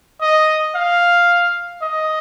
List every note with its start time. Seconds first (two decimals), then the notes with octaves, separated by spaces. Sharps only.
0.21 D#5
0.75 F5
1.82 D#5